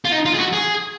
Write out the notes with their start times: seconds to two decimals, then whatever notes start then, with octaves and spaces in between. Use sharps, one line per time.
0.05 F4
0.12 D#4
0.26 F4
0.35 G#4
0.39 F#4
0.53 G#4